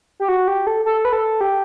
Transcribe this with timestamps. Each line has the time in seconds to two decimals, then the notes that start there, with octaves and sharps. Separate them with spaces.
0.20 G4
0.29 F#4
0.48 G4
0.67 A4
0.85 A4
1.05 B4
1.13 A4
1.41 G4